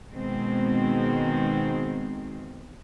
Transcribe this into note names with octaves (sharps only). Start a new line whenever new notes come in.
B2 D#3 G#3 C4